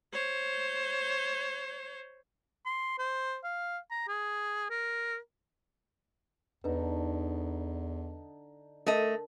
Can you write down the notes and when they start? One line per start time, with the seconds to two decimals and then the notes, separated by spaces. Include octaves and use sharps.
0.13 C5 C#5
2.66 C6
2.98 C5
3.44 F5
3.91 A#5
4.08 G#4
4.70 A#4
6.64 E2 D3 D#4 B4
8.87 A3 A#4 D#5 A5